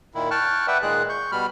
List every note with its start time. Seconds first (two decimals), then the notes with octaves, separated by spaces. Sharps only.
0.15 A#2 D#3 E4
0.31 G5 A5 C#6 F6 F#6
0.67 B4 D5 E5 F#5 G5
0.82 A#2 D#3 G#3 G#4 F#6
1.09 C#6 G6
1.32 B2 G3 B5 F6